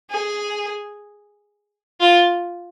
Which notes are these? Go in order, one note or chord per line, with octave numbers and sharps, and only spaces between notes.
G#4
F4